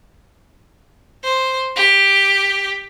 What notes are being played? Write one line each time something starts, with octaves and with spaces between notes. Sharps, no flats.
C5
G4